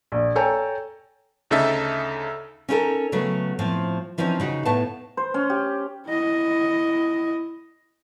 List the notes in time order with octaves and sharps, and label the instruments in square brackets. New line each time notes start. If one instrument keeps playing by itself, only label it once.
[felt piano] A#1
A4 C#5 G5 G#5 A#5
[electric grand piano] D2 C#3 D#4 A4 E5 A6
[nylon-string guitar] C#4 D#4 E4 G4 A4 A#4
C#3 F#3 A3 B3
A2 F3 C4 F4
E3 F3 C4 C#4 D#4
C#3 D#4 F#4
A2 A3 B3 F5 A5
[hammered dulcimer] C5
C#4
G4
[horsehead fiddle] E4 D#5